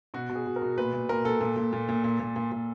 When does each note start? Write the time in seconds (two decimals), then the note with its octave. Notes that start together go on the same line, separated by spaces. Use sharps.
0.14 B2 F#4
0.29 B2
0.35 G#4
0.46 B2
0.56 A#4
0.62 B2
0.77 A#2 B4
0.93 A#2
1.09 A#2 A#4
1.25 A#2 A4
1.41 A#2
1.56 A#2
1.73 A#2
1.89 A#2
2.04 A#2
2.20 A#2
2.36 A#2
2.52 A#2